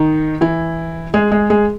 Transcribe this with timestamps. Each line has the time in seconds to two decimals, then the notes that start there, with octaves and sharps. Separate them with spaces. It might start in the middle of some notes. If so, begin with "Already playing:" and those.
Already playing: D#3 D#4
0.41 E3 E4
1.14 G#3 G#4
1.31 G#3 G#4
1.50 G#3 G#4